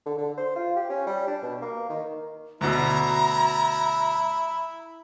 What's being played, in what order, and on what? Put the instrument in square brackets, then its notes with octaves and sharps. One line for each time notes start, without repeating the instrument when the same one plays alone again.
[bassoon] D3
D3
C5
F4
G4
C#4
G3
D4
B2
A#3
D#3
[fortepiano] D2 B2 [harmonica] E4 [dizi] A#5